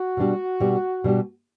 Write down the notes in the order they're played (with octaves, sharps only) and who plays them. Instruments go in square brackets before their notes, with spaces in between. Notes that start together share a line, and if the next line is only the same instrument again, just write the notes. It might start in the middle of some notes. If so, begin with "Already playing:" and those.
Already playing: [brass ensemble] F#4
[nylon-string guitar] B2 G3 D4 G4
B2 G3 D4 G4
B2 G3 D4 G4